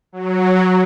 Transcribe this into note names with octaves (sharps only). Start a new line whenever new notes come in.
F#3